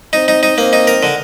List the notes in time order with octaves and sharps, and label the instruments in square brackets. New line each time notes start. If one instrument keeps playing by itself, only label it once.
[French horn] C4 [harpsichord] D#4
[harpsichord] D#4
D#4
[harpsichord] A#3 [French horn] C4
[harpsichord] D#4
A#4
D3